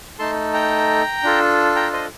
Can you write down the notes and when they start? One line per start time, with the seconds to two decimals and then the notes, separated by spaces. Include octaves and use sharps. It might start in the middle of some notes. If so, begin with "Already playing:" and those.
0.19 A3 D#4 A4 A5 C6
0.53 G5 A#5
1.23 D4 F4 A4
1.76 G5 A#5
1.93 C5 D#5